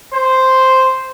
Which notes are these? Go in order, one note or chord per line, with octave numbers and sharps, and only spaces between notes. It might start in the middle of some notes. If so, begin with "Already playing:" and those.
C5